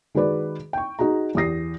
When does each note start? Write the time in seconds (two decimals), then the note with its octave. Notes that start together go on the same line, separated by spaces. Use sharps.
0.15 D#3 G#3 F#4 G#4 B4 D5
0.73 G5 C#6
0.99 D#4 F#4 G#4 A#5
1.35 E2 G4 D#6 A#6 C7